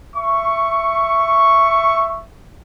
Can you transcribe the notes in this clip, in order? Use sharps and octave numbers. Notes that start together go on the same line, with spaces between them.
E5 C#6